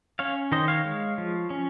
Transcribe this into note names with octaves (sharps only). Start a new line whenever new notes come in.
C#4 C#5 F5
D#3 C5 D#5
C#5 F5
G#3
F3
C#4